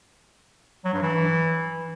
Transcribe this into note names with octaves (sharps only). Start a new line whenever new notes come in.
F#3
G2
E3